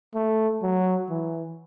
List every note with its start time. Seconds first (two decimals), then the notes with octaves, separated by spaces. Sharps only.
0.14 A3
0.62 F#3
1.09 E3